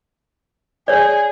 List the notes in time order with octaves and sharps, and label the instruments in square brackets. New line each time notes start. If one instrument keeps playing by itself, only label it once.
[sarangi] G#4 [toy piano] C#5 D5